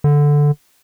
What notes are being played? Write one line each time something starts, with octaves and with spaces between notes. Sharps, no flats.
D3